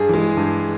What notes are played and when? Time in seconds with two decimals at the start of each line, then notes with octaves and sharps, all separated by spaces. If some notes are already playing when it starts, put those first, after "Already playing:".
Already playing: G2 G#4
0.09 E3 G#3
0.37 G2